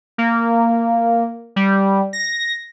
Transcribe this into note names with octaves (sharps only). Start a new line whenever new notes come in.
A#3
G3
A#6